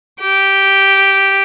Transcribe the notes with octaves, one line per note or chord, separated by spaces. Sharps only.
G4